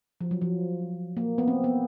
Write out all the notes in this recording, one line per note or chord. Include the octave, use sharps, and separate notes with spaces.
F3
F#3
F3
A#3
B3
C4
B3